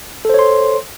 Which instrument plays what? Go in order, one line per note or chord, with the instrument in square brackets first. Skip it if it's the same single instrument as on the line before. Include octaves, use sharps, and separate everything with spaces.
[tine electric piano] A4
C5
C#5
C6